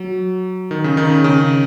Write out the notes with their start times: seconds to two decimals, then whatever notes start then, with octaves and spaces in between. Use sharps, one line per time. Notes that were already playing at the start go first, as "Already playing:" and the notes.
Already playing: F#3
0.71 D#3
0.84 C#3
0.97 D#3
1.10 C#3
1.24 C#3